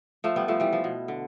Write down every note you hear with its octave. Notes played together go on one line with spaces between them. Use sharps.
F3 A3
G3 B3
F3 A3
E3 G3
F3
B2
D3